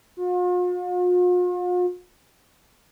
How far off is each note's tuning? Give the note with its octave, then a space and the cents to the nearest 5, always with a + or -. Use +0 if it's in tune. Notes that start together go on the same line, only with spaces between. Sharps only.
F4 +45